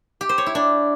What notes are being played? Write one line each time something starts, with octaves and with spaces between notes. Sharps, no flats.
G4
C5
C#5
E4
D4